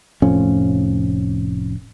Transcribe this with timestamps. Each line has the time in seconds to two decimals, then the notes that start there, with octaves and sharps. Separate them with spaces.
0.22 F1 A2 F3 C#4